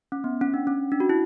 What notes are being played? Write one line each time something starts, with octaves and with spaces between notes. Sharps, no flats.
C#4
B3
C#4
D4
C#4
D4
F#4
E4